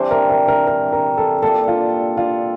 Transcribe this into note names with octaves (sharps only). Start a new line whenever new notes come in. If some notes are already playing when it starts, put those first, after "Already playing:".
Already playing: C3 E3 G3 D4 C5
A#4
A#4
A#4
A#4
A#4
A4
A#2 G3 D4 A4
F4
F4